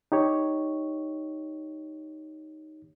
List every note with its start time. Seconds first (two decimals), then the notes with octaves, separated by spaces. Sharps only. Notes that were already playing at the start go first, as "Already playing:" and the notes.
0.12 D#4 G4 C#5